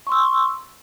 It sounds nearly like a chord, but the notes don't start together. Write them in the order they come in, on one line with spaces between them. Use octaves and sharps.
C#6 C6 E6